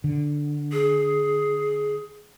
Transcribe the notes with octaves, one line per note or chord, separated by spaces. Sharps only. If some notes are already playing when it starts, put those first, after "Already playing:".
D3
G#4